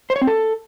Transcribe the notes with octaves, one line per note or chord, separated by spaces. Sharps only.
C5
C#5
C4
A4